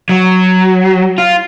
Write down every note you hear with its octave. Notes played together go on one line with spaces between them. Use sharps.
F#3
F4